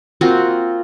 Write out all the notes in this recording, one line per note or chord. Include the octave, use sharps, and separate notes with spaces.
A#3 C4 F4 F#4